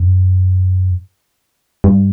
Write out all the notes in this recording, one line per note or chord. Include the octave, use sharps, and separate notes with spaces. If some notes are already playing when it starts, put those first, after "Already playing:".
Already playing: F#2
G2